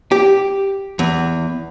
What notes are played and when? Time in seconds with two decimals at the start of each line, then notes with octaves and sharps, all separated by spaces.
0.12 G4
0.99 E2